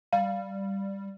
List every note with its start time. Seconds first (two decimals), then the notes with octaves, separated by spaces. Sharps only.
0.13 G3 F5